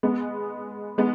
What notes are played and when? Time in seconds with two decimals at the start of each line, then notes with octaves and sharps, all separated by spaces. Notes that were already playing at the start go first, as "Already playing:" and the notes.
0.03 G#3 B3
0.98 G#3 B3